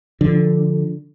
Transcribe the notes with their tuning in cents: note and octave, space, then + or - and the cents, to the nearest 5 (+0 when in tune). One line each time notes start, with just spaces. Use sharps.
D3 -5 F3 +0